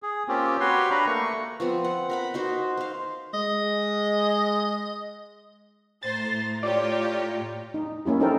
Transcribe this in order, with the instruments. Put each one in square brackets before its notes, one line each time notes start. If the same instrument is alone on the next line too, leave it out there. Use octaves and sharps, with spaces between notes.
[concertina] G#4
A#3 C4 C#4 F4 G4
F#4 G4 B4 C#5 C6
D4 B4 F5 A#5 B5
A3 A#3 C#6
[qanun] F3 B3 C4
F#5
A#4 F#5 B5
D#4 F#4 C5
C5 F5
[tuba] G#3 [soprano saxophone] D#5
[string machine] A2 A3 A#5 [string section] C5 [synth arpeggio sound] A6
[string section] F4 G4 C#5 [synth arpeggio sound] D5
[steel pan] D#4
A#3 C#4 E4 G4
C#4 D#4 A4 A#4 C5 G5